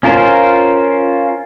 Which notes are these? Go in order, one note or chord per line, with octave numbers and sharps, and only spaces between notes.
C#4 F4 A#4 C5